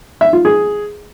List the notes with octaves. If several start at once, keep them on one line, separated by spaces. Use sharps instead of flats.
E5
F4
G#4